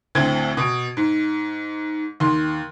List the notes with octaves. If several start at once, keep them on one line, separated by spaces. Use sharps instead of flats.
D2 A2 C4 G#6
B2 D7
G#2
D#2 C6